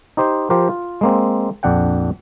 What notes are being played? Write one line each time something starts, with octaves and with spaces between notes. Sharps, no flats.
D#4 G4 C5
F3 G4 A#4 C5
F4
G#3 A#3 C4
A#1 F2 D4 F#5 G5